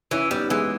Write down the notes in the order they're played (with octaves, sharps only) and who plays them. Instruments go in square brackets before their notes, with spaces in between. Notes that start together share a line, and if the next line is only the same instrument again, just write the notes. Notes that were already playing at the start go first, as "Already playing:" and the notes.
[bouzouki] E3 [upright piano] C#4 E4
[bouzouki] G3 [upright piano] B3 D#4
[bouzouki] E3 [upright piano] G#3 B3